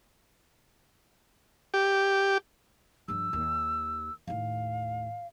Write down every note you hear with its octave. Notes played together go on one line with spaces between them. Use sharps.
G4
G2 F3 E6
D#2
D#2 A2 F5